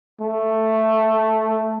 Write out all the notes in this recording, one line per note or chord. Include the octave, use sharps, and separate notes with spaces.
A3